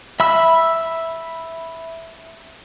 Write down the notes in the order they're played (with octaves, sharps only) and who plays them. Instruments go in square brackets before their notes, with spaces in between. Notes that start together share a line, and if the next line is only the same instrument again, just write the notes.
[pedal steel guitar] E5 B5 E6